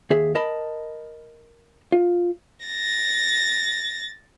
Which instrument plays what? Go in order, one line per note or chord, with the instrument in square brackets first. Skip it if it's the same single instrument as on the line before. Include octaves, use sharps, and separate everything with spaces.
[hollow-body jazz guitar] D#2 G#4 E5
A#4 D#5 A5 B5
F4
[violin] A6 A#6